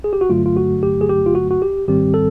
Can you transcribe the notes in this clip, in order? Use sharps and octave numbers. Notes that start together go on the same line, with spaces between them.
G#4
G4
F#4
G2 D3 F#3 A3 F4
F4
F#4
G4
G#4
G4
F4
F#4
F#4
G4
G#2 D#3 G3 C4 G4
A4